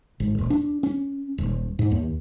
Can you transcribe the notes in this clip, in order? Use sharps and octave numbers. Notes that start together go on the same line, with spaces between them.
G#1
D#1
D4
C#4
D#1
G#2
D#2